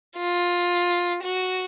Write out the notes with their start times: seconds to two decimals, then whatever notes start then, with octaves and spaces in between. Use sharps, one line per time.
0.17 F4
1.23 F#4